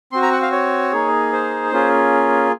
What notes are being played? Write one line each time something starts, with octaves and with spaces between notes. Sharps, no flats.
C4 F#4 C6
A#5
F#5
F5
C#5
A#3 D#4 G#4
C5
A#3 C#4 F4 G#4